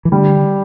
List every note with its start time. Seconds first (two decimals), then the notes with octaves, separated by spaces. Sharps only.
0.05 E3
0.12 D3 G3